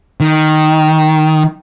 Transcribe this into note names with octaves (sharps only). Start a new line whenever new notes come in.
D#3